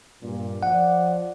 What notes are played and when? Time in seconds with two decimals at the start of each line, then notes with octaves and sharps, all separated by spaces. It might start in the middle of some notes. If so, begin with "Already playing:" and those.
0.22 G2 A#2
0.63 F3 D5 F#5